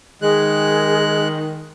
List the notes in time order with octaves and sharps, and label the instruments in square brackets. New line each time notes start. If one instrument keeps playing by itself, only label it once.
[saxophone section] D#3 [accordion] G#3 F#6 [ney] G#4